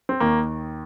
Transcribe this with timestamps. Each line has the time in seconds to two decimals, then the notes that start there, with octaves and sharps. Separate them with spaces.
0.09 C4
0.20 D#2 D#3 A#3